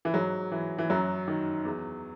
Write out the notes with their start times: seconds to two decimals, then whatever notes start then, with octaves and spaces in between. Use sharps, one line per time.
0.05 E3
0.14 G#2 F#3
0.52 E3
0.78 E3
0.90 F#2 F#3
1.28 D#3
1.65 E2